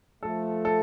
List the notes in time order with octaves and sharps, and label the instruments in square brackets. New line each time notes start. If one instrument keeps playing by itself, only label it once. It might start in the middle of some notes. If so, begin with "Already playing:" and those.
[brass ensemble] F3 A3 [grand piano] A4
[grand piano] A4